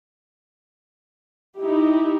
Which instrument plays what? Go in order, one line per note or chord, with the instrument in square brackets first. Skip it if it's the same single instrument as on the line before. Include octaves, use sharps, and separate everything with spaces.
[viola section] D#4 E4 G4